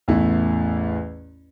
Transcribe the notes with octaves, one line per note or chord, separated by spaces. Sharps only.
A1 E2 A3 E4